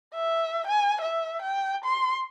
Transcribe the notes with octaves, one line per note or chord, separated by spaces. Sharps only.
E5
G#5
E5
G5
C6